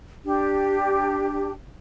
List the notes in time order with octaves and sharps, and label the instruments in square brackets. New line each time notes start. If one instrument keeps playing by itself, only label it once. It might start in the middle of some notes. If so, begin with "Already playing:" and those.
[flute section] D4 G4